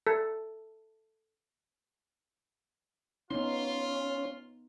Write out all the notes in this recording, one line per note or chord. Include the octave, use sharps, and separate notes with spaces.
A4
B3 C#4 D#4 F4 C6